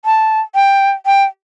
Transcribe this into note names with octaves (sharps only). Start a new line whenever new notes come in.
A5
G5
G5